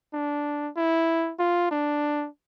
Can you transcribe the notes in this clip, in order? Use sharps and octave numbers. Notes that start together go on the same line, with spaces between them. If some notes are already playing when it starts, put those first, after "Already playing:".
D4
E4
F4
D4